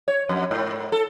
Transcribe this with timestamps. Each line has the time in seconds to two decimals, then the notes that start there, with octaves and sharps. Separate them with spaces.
0.08 C#5
0.29 F2
0.51 G#2
0.92 A4